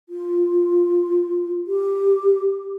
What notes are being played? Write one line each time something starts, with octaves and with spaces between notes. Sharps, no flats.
F4
G4